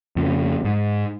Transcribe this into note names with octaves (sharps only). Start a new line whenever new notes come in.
F2 C#3
G#2